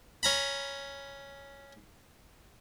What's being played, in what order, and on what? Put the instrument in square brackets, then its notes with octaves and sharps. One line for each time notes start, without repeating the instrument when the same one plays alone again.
[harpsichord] C#4 A#5 B5